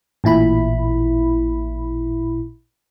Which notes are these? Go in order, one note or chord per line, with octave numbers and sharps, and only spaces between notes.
A1 A#2 E4 B5